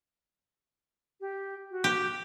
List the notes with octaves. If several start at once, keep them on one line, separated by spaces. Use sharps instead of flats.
G4
F#4
G4